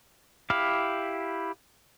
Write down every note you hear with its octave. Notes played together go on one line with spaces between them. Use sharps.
E4 G4 F5